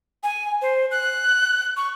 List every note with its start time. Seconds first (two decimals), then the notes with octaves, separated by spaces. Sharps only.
0.23 G#5
0.62 C5
0.91 F#6
1.77 C#6